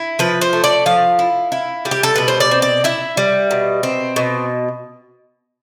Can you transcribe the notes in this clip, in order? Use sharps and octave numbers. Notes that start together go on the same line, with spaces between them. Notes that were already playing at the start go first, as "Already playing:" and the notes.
Already playing: E4
F3 B4
C5
A3
D5
F3 F5
E4
E4
G3
G4
A4
B2 B4
C5
D5
C4
D5
E4 E5
G3
B2
C4
B2